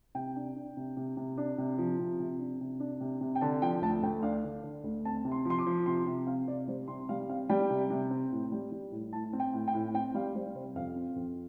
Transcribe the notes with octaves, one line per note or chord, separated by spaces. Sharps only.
C3 G5
D4
D4
C3
C3
C3
D4
C3
F3
C3
C3
D4
C3
D4
C3
C3
G5
D3 A5
F3 G5
D2 A5
D2 G5
D4 F5
D3
D3
D2
C4 A5
C3
C6
F3 C6
D6
F3
C3 C6
C3
C4 F5
C3 D5
G3 C5
C3 C6
G3 F5
C4 F5
G3 G5
C3
C3
C4
A2
G3
G3
A2
A2 A5
C4
G5
A2
G5
A2
C4 G5
G3 F5
G3 C5
C3 C5
F2 F5
C4
F2